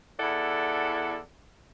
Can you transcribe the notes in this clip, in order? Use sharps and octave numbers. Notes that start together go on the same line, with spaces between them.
E2 E4 A4 D5 F#5